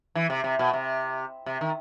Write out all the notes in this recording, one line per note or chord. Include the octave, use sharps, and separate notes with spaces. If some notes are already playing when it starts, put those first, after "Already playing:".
E3
C3
C3
B2
C3
C3
D#3